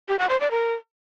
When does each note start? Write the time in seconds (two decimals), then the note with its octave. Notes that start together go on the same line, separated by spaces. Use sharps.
0.08 G4
0.19 F#5
0.30 C5
0.40 D5
0.51 A#4